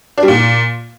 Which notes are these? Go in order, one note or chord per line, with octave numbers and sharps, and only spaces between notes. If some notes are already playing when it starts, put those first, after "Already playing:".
D4
G3
A#2